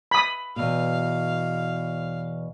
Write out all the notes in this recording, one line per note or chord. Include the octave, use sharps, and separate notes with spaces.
B5 D#6
E2 B2 F5